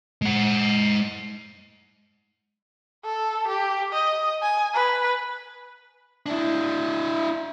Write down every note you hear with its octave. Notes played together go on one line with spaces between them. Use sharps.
G#3 F#5
A4
G4
D#5
G#5
B4
D4 E4